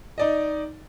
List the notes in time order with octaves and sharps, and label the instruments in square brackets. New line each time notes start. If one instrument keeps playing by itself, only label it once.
[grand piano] D#4 D5 D#5